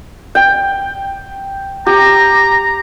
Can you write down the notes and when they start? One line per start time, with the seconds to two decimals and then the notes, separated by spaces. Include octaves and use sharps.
0.35 G5
1.86 G4 A#5